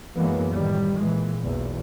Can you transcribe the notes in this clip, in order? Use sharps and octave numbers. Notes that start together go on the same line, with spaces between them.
F#2 E3 G#3 A#3 B3
A2 D#3 G3
A#2 E3 G#3
B1 E2 A#2